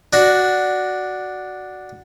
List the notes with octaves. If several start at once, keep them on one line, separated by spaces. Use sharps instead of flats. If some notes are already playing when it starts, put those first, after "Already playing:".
D4 F#4